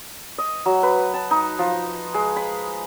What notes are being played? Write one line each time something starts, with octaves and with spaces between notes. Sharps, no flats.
D#5
F#3
B4
A5
D#4
F3
G#3
B5